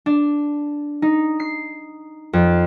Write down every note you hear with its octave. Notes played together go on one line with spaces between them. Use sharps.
D4
D#4
C7
F2